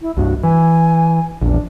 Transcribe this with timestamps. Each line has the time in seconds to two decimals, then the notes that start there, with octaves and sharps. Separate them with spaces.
0.02 E4
0.17 C2 G2 F#4
0.43 E3 G#5
1.41 A#1 E2 D4